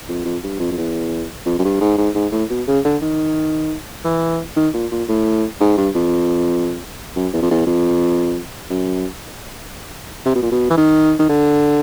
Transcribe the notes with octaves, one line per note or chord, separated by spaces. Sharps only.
F2
F2
G2
F2
F2
E2
F2
F#2
G2
G#2
G#2
G#2
A2
B2
C#3
D3
D#3
E3
D#3
A#2
A#2
A2
G#2
G2
F2
F#2
E2
F2
E2
F2
F#2
C3
B2
A#2
B2
E3
D#3
D#3
D3